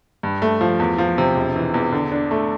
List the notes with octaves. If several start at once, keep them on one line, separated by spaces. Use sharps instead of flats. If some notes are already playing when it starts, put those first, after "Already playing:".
G2
A3
F3
E2
F3
C3
E1
E3
E2
D3
D4
A3